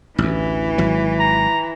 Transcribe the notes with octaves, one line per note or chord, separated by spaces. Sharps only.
A1 D2 E3
G#1 F#3
A#5